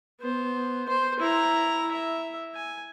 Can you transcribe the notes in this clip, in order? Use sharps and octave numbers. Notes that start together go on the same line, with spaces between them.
B3 C5
C5 C6
E4 A#5
E5
G#5